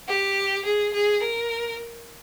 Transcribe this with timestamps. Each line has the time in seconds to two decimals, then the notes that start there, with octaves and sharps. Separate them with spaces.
0.08 G4
0.65 G#4
0.93 G#4
1.23 A#4